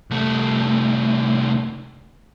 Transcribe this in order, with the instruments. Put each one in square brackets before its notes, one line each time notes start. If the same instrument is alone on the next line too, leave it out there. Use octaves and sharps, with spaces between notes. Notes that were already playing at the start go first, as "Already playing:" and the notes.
[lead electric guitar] C2 A3